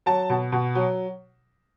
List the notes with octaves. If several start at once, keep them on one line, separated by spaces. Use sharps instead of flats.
F#3 A5
B2
B2
F#3